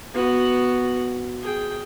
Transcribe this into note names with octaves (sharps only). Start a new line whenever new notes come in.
B3 F#4
G#4 G5